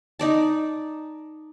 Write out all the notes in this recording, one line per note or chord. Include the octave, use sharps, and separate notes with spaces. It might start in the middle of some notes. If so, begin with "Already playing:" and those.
D#4 D5 A5